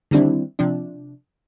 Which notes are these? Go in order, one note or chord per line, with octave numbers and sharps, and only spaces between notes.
D3 D#3 G3 C4 D4 E4
C3 F3 D4